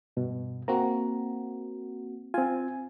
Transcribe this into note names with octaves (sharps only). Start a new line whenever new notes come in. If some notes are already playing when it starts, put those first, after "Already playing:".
G2 B2
A#3 C4 F#4 A#5
C4 F4 G#5